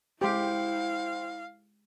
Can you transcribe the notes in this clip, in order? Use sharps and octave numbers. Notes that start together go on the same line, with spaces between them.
G#3 E4 G4 C5 F5 G5 C6